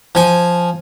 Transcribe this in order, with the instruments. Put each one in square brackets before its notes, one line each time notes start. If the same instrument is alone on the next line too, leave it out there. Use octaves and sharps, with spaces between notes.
[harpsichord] F3 G#5